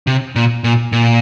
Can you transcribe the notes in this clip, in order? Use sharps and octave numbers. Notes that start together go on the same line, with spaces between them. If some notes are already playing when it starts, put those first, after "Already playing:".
C3
A#2
A#2
A#2